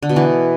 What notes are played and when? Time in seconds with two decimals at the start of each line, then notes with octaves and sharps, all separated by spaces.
0.03 D3
0.09 B2
0.16 E3